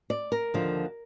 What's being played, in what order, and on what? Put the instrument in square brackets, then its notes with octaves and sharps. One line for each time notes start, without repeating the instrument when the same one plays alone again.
[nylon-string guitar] D5
A#4
D#2 D3 F3